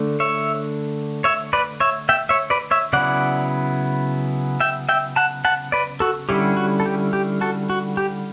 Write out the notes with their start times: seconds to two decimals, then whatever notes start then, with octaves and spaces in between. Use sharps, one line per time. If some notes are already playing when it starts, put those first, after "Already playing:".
Already playing: D3 A3 D4
0.20 C#5 E5
1.24 C#5 E5
1.53 B4 D5
1.80 C#5 E5
2.09 E5 G5
2.29 C#5 E5
2.50 B4 D5
2.71 C#5 E5
2.93 C#3 F#3 B3 E4 D5 F#5
4.60 E5 G5
4.89 E5 G5
5.16 F#5 A5
5.45 F#5 A5
5.72 B4 D5
6.00 F#4 A4
6.29 D3 G3 C#4 E4 G4
6.57 F#4
6.80 A4
6.86 G4
7.13 G4
7.41 F#4 A4
7.70 F#4
7.97 G4